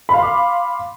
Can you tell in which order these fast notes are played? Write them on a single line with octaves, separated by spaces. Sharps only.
B5 F5 C6 D6